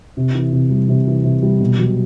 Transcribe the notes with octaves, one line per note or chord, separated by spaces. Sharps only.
C3
E3
C3
G3
C3
E3
C3
G3
B2
F#3